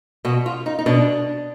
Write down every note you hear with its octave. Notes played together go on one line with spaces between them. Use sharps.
B2 F#4
F4
D#4
D#4
B2 D4